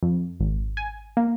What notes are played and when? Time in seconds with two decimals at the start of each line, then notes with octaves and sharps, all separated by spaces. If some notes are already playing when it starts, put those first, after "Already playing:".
0.03 F2
0.40 G#1
0.77 G#5
1.17 A#3